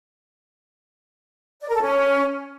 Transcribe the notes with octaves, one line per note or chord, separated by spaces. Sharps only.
D5
A#4
A4
C#4